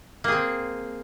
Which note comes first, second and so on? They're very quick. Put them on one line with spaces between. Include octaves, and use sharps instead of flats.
A#3 G#4 C4